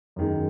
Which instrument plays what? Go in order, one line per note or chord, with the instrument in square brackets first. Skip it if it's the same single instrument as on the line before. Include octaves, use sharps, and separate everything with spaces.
[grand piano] F#2 D#3 G#3